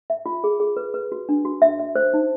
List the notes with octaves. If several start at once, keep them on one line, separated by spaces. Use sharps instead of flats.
E5
F4
G#4
G#4
B4
B4
F#4
D4
F#4
E5
E5
C5
D#4